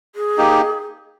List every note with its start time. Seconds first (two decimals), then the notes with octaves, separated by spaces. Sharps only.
0.15 G#4
0.38 A#3 D#4 G4